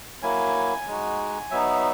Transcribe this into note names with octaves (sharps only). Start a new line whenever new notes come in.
F#3 A#3 E4 G#5
G#3 D#4 F#4
F#3 B3 D#4 E5